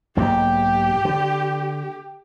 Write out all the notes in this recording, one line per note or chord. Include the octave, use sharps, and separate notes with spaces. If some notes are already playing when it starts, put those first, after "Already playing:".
B1 G#2 A#3 G4
D3